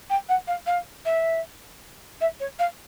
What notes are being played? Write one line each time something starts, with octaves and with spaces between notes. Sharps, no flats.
G5
F#5
F5
F5
E5
E5
C#5
F5